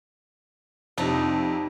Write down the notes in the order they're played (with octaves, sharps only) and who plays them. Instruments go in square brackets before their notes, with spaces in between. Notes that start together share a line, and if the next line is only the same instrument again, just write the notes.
[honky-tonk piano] F2 C3 [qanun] C4 D4 D#4